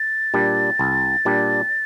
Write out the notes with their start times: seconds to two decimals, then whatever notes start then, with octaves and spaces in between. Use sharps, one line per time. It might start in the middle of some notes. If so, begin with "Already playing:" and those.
Already playing: A6
0.34 A#2 G3 D4
0.79 C2
1.25 A#2 G3 D4